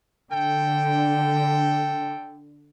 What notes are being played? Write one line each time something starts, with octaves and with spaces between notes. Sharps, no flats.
D3 A4 G5